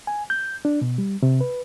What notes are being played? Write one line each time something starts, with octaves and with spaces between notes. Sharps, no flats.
G#5
G6
D4
B2
G3
C3
B4